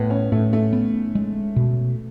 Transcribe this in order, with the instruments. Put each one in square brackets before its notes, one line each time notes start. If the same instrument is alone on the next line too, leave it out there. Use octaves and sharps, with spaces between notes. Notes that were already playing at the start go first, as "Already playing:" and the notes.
Already playing: [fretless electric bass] A2 [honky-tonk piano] B3
[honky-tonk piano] C#4
[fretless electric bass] A2 [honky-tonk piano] A3
[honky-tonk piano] A3
[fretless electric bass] B3
G#3
B2